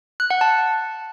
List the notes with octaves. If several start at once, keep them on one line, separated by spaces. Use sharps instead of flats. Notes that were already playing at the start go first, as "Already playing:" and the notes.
F#6
F#5
A5